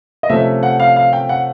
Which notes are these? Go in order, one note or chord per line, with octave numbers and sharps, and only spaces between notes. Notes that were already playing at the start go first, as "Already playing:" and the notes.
D#5
C3 F3 A3 C#4 E5
F#5
F5
F5
G5
F#5